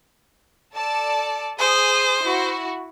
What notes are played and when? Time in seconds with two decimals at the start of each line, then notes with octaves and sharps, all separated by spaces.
0.73 A4 D5 A5
1.59 G#4 C5 D#6
2.22 E4 F#4